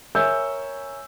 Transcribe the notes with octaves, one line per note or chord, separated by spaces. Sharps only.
A#4 C#5 E5 G#5 E6 G6